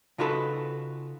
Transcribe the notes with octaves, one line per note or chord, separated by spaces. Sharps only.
C#3 D#4 F4 F#4 A4 B4